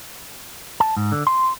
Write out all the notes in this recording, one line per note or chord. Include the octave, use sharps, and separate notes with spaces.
A5
G#2
D3
C6